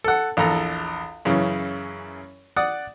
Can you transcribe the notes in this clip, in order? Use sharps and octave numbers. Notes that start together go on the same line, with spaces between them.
A4 F#5
A#1 E2 A4 A#5
F#2 C#3 E3
D5 F#5 D#6